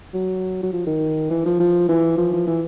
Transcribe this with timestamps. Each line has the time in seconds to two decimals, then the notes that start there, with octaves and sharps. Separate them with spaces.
0.14 F#3
0.63 F#3
0.73 F3
0.87 D#3
1.31 E3
1.46 F3
1.60 F3
1.89 E3
2.17 F3
2.33 F3
2.47 E3